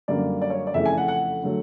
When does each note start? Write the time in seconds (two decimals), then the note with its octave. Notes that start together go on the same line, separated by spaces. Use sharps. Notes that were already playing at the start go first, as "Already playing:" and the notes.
0.08 F#2 D3 G3 A#3 D5
0.42 D5
0.50 C#5
0.67 D5
0.74 F2 C#3 E3 A3 E5
0.86 G#5
0.98 F#5
1.08 F#5
1.43 D3 F#3 A3